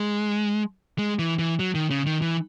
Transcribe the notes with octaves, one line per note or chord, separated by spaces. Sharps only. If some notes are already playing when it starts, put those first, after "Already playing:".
Already playing: G#3
G#3
E3
E3
F#3
D#3
C#3
D#3
E3